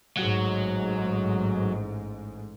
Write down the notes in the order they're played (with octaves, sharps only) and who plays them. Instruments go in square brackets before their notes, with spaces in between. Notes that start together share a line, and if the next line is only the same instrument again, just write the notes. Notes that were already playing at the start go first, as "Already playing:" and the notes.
[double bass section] A1 G#2 G#3 [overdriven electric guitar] F#3